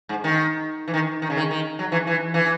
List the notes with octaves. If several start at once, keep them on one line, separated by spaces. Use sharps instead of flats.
G#2
D#3
E3
D#3
D#3
C#3
D#3
D#3
F#3
E3
E3
E3